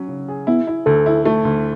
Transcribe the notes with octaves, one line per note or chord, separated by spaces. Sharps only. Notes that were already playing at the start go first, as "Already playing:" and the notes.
Already playing: F#3 C#4
C#3
G#4
B3 E4
E4
D2 A4
E4
A3
D2